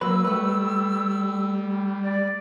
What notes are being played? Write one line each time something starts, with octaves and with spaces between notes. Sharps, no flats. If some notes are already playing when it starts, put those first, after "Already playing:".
F#3 A#3 B4 E6
G3 A3 B4
D5